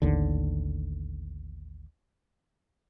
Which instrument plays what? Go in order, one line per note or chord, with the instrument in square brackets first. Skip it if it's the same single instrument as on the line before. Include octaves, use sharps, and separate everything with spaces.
[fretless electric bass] A1 D#2 D3